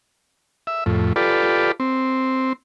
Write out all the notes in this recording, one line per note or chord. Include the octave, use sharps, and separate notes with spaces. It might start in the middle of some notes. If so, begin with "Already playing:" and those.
E5
F2 A2
F4 G4 A4 B4 D5
C4